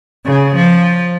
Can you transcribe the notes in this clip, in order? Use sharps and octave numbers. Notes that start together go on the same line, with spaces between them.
C#3
F3